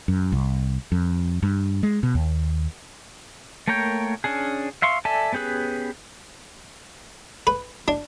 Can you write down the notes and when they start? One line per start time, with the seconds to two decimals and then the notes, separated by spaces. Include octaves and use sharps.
0.08 F#2
0.32 C2
0.92 F2
1.43 G2
1.83 G#3
2.03 B2
2.15 D#2
3.68 A3 A#3 A#4 C#5 G5
4.24 C#4 D4 G#4
4.82 E5 F5 C6 C#6
5.05 A4 D5 E5 G#5 A5
5.33 B3 C#4 G4 G#4 B4
7.47 B4
7.88 D4